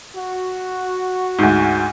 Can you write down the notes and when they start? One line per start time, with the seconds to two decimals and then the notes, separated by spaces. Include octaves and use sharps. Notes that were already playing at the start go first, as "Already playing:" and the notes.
0.15 F#4
1.39 D2 G#2